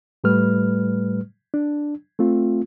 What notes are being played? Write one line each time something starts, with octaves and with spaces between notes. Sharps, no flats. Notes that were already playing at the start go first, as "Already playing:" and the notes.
A2 G3 A3 B4 F6
D4
A3 C4 F4